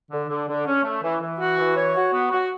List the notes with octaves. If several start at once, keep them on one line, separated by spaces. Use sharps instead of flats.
D3
D3
D3
C#4
A3
E3
E3
F#4
E3
C#5
F#4
B3
F#4